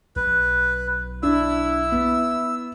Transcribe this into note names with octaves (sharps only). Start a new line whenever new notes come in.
B1 B4
D4 E4 E6
B3